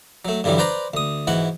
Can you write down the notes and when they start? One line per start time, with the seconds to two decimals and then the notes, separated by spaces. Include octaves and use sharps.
0.25 F#3 A3
0.44 G2 D3 E3 F#3 G3
0.58 B4 C5 D5 A#5 C6
0.94 D2 D#6
1.27 G#2 E3 F#4 F#5